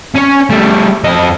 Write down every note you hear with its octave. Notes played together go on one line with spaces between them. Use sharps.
C#4 C#5
G3 A3
F2 D#5